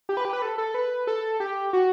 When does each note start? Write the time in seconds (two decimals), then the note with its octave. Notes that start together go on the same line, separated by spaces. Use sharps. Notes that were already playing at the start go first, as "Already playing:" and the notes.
0.09 G4
0.17 B4
0.25 G4
0.33 B4
0.42 A4
0.58 A4
0.74 B4
1.07 A4
1.40 G4
1.73 F#4